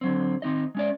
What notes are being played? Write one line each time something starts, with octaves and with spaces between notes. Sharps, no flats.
D3 F#3 C4
D#3 C4 D#4 D#5
G#3 C#4 D5